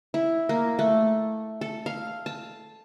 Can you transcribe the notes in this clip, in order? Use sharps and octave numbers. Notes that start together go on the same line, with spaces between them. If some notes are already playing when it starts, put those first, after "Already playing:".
E4
A#3
A3
A4
F5
A5